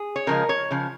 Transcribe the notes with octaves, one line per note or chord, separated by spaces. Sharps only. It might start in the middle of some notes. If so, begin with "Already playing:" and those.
Already playing: G#4
C#5
C#3 F3 G#3 A#4
C#5
C#3 F3